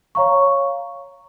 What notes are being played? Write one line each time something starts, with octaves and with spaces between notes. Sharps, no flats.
C#5 F5 A#5 C#6